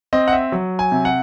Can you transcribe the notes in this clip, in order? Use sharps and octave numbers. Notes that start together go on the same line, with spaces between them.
C4 D#5
F#5
E5
F#3
G#5
C3
F#5